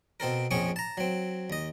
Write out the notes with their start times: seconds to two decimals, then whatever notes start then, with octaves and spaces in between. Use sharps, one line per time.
0.20 B2 C4 A4 A#4
0.51 A#1 F2 C4 C#4 G#4 C#6
0.76 A5 A#5
0.97 F#3 C4
1.50 D#2 D#5